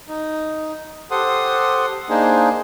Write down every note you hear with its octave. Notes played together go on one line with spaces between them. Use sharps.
D#4
G4 A4 C5 F#5 C6 D#6
A#3 D4 D#4 G#4 C5